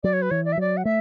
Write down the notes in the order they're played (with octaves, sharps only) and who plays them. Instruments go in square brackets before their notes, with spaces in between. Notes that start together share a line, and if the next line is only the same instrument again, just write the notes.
[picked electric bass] F#3 [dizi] D5
[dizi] C#5
B4
[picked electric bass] E3 [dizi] C#5
[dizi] D5
E5
[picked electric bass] F#3 [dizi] D5
[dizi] F#5
[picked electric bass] A3 [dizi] E5